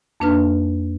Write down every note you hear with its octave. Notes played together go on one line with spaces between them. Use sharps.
F2 A#3 D4 D#4 B4 F6